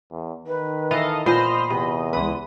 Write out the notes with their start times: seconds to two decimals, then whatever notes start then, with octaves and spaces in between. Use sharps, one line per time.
0.11 E2
0.47 D#3 B4
0.91 E3 A4 D#5 F5
1.26 A#2 B3 C5 D#5 B5 F6
1.70 E2 C3 D#5
2.13 C#2 E3 B4 C6 D#6